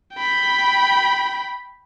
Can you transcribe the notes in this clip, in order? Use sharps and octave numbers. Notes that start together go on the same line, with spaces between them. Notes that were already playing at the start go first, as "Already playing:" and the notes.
G5 B5